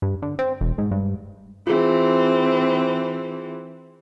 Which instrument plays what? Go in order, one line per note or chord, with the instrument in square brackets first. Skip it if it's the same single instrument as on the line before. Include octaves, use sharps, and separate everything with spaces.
[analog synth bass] G2
D3
C4
E1
G#2
G2
[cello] E3 C4 [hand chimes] F4 G#4